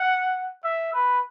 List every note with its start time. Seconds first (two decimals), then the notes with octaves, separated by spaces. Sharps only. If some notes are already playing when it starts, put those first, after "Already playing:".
Already playing: F#5
0.64 E5
0.93 B4